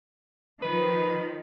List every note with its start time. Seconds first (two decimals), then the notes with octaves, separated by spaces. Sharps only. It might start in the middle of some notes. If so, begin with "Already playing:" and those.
0.62 D#3 F3 B4